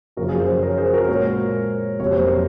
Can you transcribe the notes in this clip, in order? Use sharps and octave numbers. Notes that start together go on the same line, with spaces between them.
F#2 C#3 F3 A#3 F#4 A#4
F4 G#4
G#4 C5
A#4 C#5
G#4 C5
F#4 A#4
A#2 G#3 A#4 C#5
F2 C3 F#3 A#3 C#5
C5
A#4 C#5